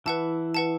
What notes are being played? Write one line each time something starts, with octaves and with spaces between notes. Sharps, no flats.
E3 E4 B4 F#5 A5
B4 F#5 A5